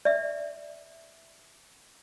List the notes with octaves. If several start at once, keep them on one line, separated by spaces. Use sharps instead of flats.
D5 E5